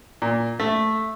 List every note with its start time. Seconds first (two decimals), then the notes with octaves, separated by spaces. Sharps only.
0.22 A#2
0.60 A3